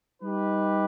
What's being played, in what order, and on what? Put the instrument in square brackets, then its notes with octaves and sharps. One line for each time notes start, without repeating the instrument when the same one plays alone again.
[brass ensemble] G3 D#4 G4 B4